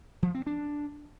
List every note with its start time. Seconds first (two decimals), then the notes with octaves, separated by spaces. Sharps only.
0.23 F3
0.35 C4
0.47 D4